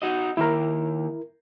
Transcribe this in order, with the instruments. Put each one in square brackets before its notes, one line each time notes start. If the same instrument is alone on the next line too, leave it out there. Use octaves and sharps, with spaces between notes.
[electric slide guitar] D#4 F#4 D#5
[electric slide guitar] D#3 A#3 [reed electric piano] E4 A#4